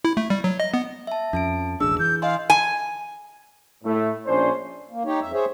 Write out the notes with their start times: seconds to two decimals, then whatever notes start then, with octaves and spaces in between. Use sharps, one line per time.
0.05 E4
0.17 A3
0.30 G3
0.44 F#3
0.60 D#5
0.74 B3
1.07 E5 A5
1.33 F2 C#4 A5 D7
1.81 E1 A1 D4 G#4 E6
2.00 E3 G6
2.22 D#5 F5 G#5 C6
2.50 G#5
3.84 A2 A3
4.26 A#1 C#4 D4 C5
4.91 A#3
5.05 D#4 G4 C#5
5.21 F2 E5
5.33 G#4 C5 C#5 E5